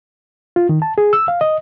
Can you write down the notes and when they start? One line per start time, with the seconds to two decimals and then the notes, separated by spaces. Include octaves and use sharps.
0.56 F4
0.69 D#3
0.82 A5
0.98 G#4
1.13 E6
1.28 F5
1.41 D#5